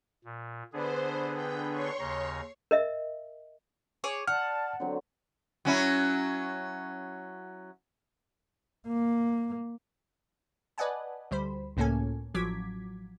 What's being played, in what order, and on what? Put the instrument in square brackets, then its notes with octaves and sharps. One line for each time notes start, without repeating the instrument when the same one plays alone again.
[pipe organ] A#2
[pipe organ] D3 B3 G#4 [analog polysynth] D4 B4 [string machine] C5
[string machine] G5
C#5 C6 C#6
[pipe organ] D#2 C#3 A#5
[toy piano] A#4 D#5 E5
[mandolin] G#4 C#5 D6
[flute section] D5 A5 [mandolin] F#5 [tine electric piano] F6
[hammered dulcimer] D3 F#3 C4
[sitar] F#3 C#4 E4
[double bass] A#3
[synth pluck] B4 D5 D#5 F#5 G#5 A5
D2 G3 C5 B5
C#2 A2 A#3 C#4 A4 G#5
A1 F3 F#3 D6 G#6 B6